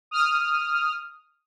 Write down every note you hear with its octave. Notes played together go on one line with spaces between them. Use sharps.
D#6 F6